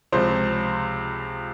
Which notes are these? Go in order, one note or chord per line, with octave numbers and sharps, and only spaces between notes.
C#2 C3 F3 C5